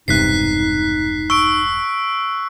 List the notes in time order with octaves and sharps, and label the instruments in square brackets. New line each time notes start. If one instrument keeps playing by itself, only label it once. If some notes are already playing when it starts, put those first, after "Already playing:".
[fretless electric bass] E1 G2 C3 [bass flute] D#4 [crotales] F#6 B6 C7
[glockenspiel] C#6 [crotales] E6 D7